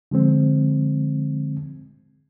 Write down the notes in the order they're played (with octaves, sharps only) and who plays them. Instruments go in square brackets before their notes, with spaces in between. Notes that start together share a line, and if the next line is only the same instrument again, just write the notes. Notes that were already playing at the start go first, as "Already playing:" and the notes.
[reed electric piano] D3 F3 G#3 C4